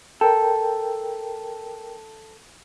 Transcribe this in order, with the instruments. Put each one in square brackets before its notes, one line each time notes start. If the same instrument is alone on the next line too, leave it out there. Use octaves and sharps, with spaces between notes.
[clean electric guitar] A4 [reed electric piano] A#4 G5